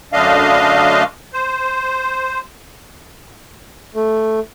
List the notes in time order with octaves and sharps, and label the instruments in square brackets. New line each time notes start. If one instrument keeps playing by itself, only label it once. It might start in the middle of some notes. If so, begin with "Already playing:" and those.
[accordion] F#2 D3 A3 D4 D#5 F5
C5
[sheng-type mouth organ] A3